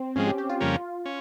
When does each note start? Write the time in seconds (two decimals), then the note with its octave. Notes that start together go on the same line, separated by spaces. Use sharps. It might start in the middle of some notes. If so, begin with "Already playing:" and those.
Already playing: C4
0.16 G#2 F3 G#3 C#4
0.27 G4
0.38 G4
0.49 F4
0.60 F2 C#3 G3 A#3 C#4 F4
1.06 C#4